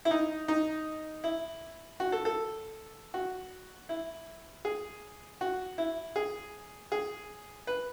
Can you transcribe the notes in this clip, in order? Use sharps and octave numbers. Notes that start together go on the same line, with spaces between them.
E4
D#4
D#4
E4
F#4
A4
A4
F#4
E4
G#4
F#4
E4
G#4
G#4
B4